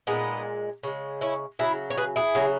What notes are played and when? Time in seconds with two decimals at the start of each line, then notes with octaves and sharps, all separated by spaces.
0.07 A#2 G#3 B3 D#4
0.83 C#3 G#3
1.21 C#4 E4
1.59 C#3 F#3 E4 G#4
1.90 C#5
1.97 G#4 B4
2.16 E4 G#4
2.35 C#3 F#3